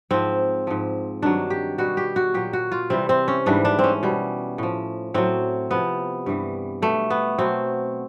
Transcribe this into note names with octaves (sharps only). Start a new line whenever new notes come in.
G#2 F3 C4
G#2 F3
G2 D#3 F#3 D4
G4
B2 G3 F#4
G4
F#4
A#2 F#3 G4
F#4
F4
C3 E3 G3 C4
C4
C#4
G#2 E3 G3 D4
D4
C4 C#4
B2 G3
A2 F3
A2 F#3 C4
C3 F3 B3
G2 E3 G3
B2 G3 A3
B3
B2 F#3 C4